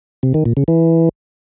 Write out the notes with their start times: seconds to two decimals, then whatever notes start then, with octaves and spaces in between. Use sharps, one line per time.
0.23 C3
0.34 D#3
0.46 A#2
0.57 C#3
0.68 E3